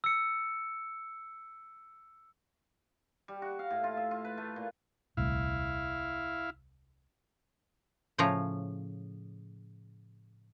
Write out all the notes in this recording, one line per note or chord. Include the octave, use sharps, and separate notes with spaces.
E6 C#7
G3
F#4
F5
A2
F4
E5
F4
B4
A3
A#2
D#1 C2 A3 E4 F5
A2 C#3 F3 C#5 A#5